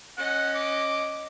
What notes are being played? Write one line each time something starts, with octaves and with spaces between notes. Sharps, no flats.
C#4 D#5 F#5
D6